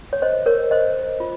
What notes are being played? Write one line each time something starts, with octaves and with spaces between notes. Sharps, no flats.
C#5
C5 D#5
A#4 C#5
C5 D#5
F4